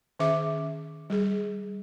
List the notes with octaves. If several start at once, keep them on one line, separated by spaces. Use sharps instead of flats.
D#3 C#4 G#4 E5 D6
G3 G#4